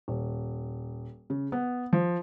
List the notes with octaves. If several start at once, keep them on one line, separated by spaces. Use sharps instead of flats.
D#1
C#3
B3
F3